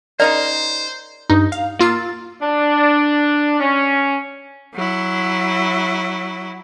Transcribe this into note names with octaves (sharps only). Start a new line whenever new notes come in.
C#3 D#4 A#4 C5 D5
G2 D#4
F5
A#3 F4 E6 A6
D4
C#4
F#3 E4